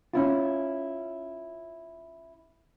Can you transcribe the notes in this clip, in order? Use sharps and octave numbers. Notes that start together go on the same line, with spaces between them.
C#4 E4 F4